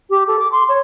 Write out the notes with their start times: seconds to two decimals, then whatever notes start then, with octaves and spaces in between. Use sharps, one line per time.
0.10 G4
0.27 A4
0.39 D6
0.52 C6
0.69 C#5